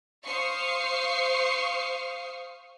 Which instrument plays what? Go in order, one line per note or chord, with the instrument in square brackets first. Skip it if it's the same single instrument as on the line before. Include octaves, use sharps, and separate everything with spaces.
[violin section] C5 F5 C#6 D#6 C7